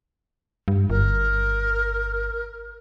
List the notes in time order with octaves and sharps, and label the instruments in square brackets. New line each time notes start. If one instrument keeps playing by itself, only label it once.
[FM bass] G2
[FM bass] G1 [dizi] A#4